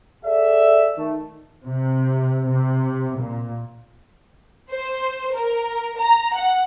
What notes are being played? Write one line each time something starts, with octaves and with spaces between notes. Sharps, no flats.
G#4 A4 D5 E5
D#3 A3
C3
C3
A#2
C5
A#4
A#5
F#5